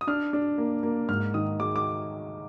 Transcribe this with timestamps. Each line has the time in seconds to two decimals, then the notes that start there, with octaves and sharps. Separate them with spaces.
0.01 D#6
0.07 D4 F6
0.33 D4
0.58 A#3
0.83 A#3
1.08 G#2 F6
1.34 D#3 D#6
1.60 G#3 D6
1.76 D6